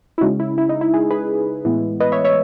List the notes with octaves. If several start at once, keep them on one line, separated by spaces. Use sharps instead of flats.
E4
C#3 G#3 C#4 D#4 F#4
E4
E4
D#4
E4
E4 G#4
G#4 B4
A2 E3 G#3 B3
B4 D#5
C#5 E5
C#5 E5